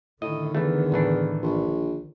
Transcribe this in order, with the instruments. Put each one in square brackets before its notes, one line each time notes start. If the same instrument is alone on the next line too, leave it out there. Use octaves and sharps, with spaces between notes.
[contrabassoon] A2 [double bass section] D3 D#3 [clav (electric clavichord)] D#5
[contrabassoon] E2 [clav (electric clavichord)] E3 A3
[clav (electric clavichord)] A2 E3 D4
[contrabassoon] A#1